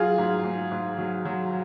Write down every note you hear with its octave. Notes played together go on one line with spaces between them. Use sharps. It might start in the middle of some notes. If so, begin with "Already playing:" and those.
Already playing: F#3 F4 G#4
G#2
G#2
G#2
F#3
F#3